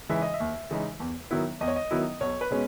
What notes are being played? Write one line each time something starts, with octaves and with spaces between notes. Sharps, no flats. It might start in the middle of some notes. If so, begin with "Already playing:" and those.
C#3 E3 G#3 D#4 E5
D#5
E5
D#2
C#3 E3 G#3 D#4
E2
D#3 F#3 B3 E4
E2 D#5
C#5
D#5
D#3 F#3 B3 E4
B1 C#5
B4
B2 G#3 C#4